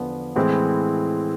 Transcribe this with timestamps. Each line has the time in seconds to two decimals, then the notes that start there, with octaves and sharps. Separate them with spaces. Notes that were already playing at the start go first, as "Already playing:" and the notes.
Already playing: E2 D3 F3 B3
0.36 A2 E3 G#3 C4 E4